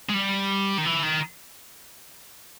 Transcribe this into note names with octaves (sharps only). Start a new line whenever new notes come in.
G#3
G3
D#3
E3
D#3